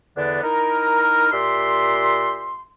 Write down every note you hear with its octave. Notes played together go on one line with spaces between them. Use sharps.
E2 D3 B3 D4 D5
D#4 E4 A#4
A#2 G4 E5 C6